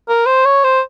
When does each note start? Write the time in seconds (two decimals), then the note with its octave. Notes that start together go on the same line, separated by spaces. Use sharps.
0.09 A#4
0.26 C5
0.45 C#5
0.64 C5